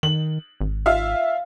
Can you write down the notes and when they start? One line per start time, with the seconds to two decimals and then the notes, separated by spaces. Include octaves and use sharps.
0.03 D#3 F#7
0.61 G#1
0.86 F4 E5 F5